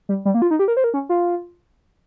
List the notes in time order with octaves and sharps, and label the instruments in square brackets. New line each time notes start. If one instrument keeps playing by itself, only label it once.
[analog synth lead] G3
G3
A#3
F4
D#4
G4
A#4
C5
A#4
C#4
F4